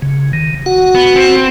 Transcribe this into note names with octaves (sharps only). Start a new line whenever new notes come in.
C#3
D#3
F#4 F#5
B3
C4